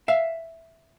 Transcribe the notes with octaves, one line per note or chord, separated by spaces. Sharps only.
E5 F5